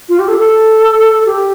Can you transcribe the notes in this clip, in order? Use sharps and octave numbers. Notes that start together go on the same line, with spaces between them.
F4
G4
A4
A4
G4